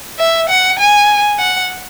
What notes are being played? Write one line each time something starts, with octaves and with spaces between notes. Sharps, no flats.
E5
F#5
G#5
F#5